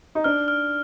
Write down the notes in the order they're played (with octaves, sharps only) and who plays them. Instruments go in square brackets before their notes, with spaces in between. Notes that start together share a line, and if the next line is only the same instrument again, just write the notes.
[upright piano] D#4
[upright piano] D4 [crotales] F6
[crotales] F6